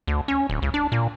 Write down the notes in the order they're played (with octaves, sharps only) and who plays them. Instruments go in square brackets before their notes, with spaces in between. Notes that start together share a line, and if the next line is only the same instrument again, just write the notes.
[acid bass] D2
C#4
D1
C#2
D4
A#2